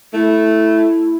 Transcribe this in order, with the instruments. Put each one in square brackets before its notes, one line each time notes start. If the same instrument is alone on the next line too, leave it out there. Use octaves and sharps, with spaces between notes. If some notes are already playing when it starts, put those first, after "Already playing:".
[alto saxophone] A3 [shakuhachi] E4